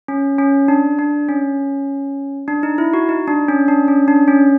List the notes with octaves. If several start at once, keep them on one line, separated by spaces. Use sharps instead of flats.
C#4
C#4
D4
D4
C#4
D4
D#4
E4
F#4
D#4
D4
C#4
D4
C#4
D4
C#4